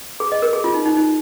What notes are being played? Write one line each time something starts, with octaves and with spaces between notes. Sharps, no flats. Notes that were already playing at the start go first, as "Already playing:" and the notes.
G#4
D#5
A#4
G#4
F4
D#4
D#4
D#4